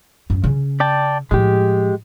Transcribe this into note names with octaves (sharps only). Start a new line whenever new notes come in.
F#2
C#3 C#4
D5 G5 A5
A2 F3 G#3 G4